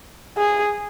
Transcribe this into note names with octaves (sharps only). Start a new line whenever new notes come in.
G#4